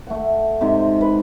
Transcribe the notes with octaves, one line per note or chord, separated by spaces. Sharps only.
A3 F#5
G#2 C3
B4